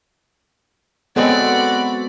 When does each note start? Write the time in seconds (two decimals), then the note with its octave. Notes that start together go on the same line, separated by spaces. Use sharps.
1.16 F#3 G#3 B3 C4 F#4 A4 D5 B5